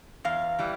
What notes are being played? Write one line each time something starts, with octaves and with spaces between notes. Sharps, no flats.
E2 F5
E3 G3